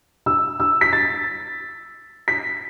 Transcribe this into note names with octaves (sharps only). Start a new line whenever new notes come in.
E6
E6
B6
A6
B6